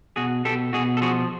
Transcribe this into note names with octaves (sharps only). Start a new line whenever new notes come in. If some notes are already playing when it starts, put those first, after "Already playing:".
B2 F#4 G#4
B2 G4 A4
B2 F#4 G#4
A4
F3 F#4 G#4